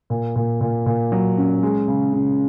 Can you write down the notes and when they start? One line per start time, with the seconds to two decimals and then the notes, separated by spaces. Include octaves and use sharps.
0.10 A#2
0.36 A#2
0.61 A#2
0.86 A#2
1.12 F#3
1.38 C#4
1.63 G#3
1.88 C#3
2.13 C#3